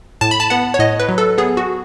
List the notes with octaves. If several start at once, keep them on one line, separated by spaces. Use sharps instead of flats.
A2 A5
B5
A5
B3 F#5
C#5
A2 D#5
B4
F#3
A4
B3 G#4
F#4